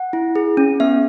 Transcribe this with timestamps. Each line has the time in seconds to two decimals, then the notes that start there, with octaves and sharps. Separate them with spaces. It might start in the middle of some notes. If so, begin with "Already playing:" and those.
Already playing: F#5
0.13 E4
0.36 G#4
0.57 C#4
0.80 B3 E5